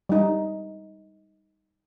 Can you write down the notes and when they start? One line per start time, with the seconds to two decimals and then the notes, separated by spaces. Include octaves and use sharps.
0.09 G3 D#4